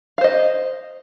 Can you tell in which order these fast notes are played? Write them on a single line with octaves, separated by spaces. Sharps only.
F5 C5 D#5